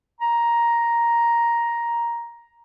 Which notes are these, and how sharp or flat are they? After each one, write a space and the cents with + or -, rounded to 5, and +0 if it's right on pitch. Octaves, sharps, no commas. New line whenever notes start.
A#5 +5